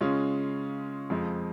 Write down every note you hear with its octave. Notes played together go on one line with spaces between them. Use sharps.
C#3 G#3 C#4 F4
F2 F3 G#3